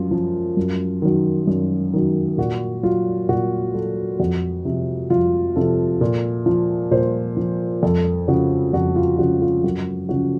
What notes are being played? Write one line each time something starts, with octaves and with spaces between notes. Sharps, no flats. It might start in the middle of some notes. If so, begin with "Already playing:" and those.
Already playing: F#2 F3 F4
F3
F#2
D#3 F#3
F#2
D#3 F#3
A#2 F#4
F#3 F4
A#2 F#4
F#3 A4
F2 F#4
C3 F3
F2 F4
C3 F3 A4
A#2
F3
A#2 C5
F3
F2 A4
C#3 F3 F#4
F2 F#4
F4
C#3 F3 F#4
F4
F#2 F#4
C#3 F3 F#4